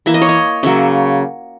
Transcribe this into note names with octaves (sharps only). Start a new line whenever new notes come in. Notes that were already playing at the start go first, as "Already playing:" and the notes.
E3 A#3 E5
D#5
C#5
D#5
C#3 F#3 A#3 E5